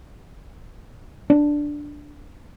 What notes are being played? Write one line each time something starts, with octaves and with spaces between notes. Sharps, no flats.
D4